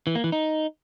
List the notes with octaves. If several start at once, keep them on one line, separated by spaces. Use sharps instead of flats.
E3
A#3
E3
D#4